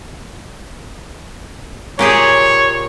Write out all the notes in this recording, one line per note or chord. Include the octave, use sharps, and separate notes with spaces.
A#2 G4 G#4 C#5